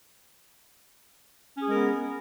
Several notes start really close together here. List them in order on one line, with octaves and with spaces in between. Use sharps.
C#4 G#4 G#3 A#4 B3